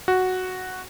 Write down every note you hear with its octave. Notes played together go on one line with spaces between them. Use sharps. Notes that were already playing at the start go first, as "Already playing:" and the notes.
F#4